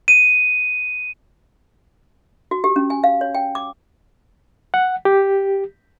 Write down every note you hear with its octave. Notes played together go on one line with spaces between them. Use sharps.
D#7
F#4
G4
C#4
G#5
F5
C#5
G5
D6
F#5
G4